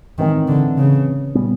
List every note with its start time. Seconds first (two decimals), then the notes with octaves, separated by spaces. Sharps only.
0.18 A2 D#3 E3 G#3 C4
0.48 D3
0.77 C#3
1.35 A#2 G3 B3